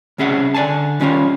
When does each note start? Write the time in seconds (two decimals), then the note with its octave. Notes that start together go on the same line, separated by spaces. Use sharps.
0.18 C2 C#3 C#4 G#4 E5 F#5
0.54 D3 D5 F5 G#5 A5
1.00 D#3 G3 C#4 D#4 F4 C#5